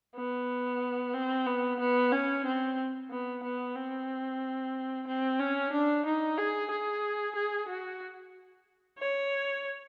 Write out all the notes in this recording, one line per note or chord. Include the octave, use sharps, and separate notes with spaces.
B3
C4
B3
B3
C#4
C4
B3
B3
C4
C4
C#4
D4
D#4
G#4
G#4
G#4
F#4
C#5